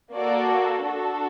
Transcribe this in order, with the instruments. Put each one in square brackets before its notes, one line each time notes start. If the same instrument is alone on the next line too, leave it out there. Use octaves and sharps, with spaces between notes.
[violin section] A#3 F#4 A4 D5
D4 F#4 A4